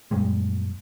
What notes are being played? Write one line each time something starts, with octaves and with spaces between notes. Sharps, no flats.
F#2 A#2 G3 G#3